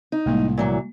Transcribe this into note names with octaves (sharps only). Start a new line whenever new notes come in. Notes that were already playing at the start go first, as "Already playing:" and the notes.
D#4
C2 A2 G3 G#3 A#3
A#2 E3 F#3